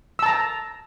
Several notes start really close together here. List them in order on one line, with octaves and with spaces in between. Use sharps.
E6 A5 A#5